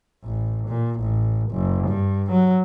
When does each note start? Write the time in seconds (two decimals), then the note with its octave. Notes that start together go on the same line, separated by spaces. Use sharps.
0.23 A1
0.68 A#2
1.00 A1
1.51 F#1
1.88 G2
2.31 F#3